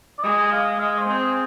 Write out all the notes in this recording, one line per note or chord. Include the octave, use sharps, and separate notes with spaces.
D5
G#3 D#5
F5
G#3 D#5
C5
C4
G#4